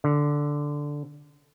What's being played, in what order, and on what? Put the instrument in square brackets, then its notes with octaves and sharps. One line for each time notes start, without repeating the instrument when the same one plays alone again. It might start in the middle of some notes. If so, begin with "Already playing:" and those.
[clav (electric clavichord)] D3